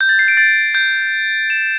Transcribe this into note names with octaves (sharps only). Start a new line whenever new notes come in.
G6
A6
C7
D7
A6
G6
E7